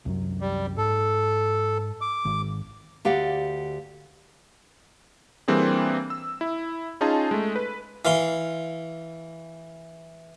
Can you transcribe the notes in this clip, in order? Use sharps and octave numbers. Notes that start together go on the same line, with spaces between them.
C2 F#2 F#3
G3
G#2 A4
D6
G#1
D2 G4 D5 F5 F#5
E3 G3 A#3 C4 D4 G#4
E6
E4
C#4 D#4 F4 G#4 A5
G#3 A3
B4
E3 F5 C6